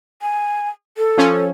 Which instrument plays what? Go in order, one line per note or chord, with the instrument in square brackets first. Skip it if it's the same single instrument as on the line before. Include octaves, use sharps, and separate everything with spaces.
[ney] G#5
A4
[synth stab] F3 C#4